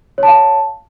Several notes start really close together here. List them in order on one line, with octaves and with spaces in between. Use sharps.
C#5 A5 F5